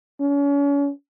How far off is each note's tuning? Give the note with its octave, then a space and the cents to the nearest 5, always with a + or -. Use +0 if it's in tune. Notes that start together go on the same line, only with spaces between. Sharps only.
C#4 +35